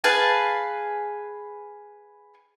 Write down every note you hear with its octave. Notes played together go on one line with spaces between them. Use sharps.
G#4 B4 F5 A5